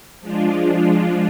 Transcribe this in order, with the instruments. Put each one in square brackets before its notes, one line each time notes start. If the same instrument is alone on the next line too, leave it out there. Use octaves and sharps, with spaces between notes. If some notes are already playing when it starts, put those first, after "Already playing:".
[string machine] F3 G#3 D4 F4